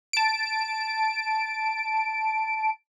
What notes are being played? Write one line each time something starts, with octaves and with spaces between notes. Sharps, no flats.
A5 D7